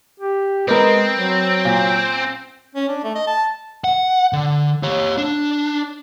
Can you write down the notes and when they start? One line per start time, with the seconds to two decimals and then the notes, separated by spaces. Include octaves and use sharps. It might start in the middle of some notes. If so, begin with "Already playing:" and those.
0.20 G4
0.68 G#3 B3 C4 A#4
1.17 F#3
1.65 A#2
2.75 C#4
2.88 D4
3.04 A3
3.15 D#5
3.27 A5
3.84 F#5
4.33 D3
4.83 G4 C#5
5.18 D4